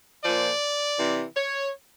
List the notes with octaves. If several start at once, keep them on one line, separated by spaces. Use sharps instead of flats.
A#2 F3 D5
C3 E3
C#5